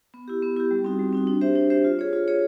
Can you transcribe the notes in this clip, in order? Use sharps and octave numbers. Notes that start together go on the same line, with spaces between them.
B3
E4 G4
B3
E4 G4
G3
C4 D#4 F#4
G3
C4 D#4 F#4
D4
G4 C5 E5
D4
G4 C5 E5
F4
G#4 C#5
F4
G#4 C#5